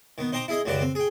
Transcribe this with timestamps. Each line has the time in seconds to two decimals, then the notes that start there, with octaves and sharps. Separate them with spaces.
0.18 D#3 B3
0.32 D#4 C5 G5 A#5 D6
0.48 E4 G#4 D#5
0.65 C#2 F#2 D#3 F#4 G4 D5
0.81 C4
0.95 G#4 G5